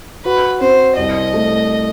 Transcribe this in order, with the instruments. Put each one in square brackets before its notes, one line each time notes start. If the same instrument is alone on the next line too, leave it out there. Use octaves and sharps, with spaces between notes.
[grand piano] F#4 [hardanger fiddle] B4
[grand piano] C4 [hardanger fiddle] C5
[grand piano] C2 [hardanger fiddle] D#5
[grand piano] A3